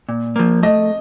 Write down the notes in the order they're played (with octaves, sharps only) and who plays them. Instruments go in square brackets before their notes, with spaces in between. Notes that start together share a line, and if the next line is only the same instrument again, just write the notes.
[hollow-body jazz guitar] A#2
F3 A#3
[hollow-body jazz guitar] A3 [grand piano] D#5